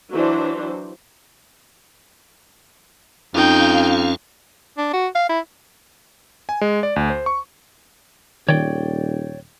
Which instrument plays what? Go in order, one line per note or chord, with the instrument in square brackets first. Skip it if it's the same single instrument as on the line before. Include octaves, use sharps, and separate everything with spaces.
[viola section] E3 F#3 D4 C5
[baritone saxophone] F2 [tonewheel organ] C#4 F5 [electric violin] D#4 G5
[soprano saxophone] D4
F#4
F5
E4
[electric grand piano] G#5
G#3
D5
D2
C5
C#6
[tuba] D#1 [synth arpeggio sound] D#3 [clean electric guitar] C#5 D5 G5